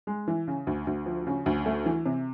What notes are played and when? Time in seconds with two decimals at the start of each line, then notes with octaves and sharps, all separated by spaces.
0.07 G#3
0.28 E3
0.48 C#3
0.67 D2
0.87 D2
1.06 F3
1.27 C#3
1.46 D2
1.66 A3
1.86 E3
2.06 C3